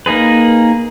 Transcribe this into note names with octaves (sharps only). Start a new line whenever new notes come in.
A#3 D#4 G#4 B4